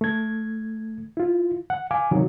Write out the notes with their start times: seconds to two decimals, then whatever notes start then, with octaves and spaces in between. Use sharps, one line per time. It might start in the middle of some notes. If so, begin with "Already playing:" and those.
0.01 A3 G#6
1.17 E4 F4
1.70 F#5
1.91 F5 G#5 D6
2.11 C3 D#3 F#3